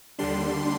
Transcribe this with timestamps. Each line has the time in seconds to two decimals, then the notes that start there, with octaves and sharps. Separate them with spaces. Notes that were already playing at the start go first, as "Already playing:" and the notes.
0.19 D#2 D3 G3 D4 C6